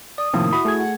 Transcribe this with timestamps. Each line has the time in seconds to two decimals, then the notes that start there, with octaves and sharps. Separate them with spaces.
0.18 D5 D#6
0.33 A2 C3 D#3 F3 A#3 C4
0.53 E4 F#4 B5
0.65 A3 G#4 G#6
0.79 F#5